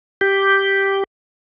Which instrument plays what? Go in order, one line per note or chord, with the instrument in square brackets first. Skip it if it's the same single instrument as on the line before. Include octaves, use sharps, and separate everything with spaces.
[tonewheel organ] G4